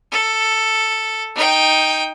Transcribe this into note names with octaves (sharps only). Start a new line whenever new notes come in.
A4
D#4 G5